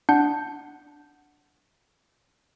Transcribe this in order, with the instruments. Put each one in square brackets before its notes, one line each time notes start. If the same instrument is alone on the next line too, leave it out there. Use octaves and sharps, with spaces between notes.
[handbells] D4 F#5 G6